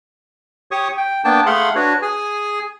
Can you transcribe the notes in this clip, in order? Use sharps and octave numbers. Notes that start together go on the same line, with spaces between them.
G4 C#5 C#6 D#6
G5
A#3 B3 D4 G5 A5
A3 G#4 F5 F#5 B5 C6
D4 F#4 B4 C#5
G#4 G#5